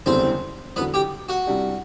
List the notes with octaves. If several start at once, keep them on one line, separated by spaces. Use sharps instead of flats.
F#1 E2 D3 G3 B3 C4 C5
E2 D3 F#3 B3 B4
G4 G5
F#4 F#5
C2 C3 G3 D4 G4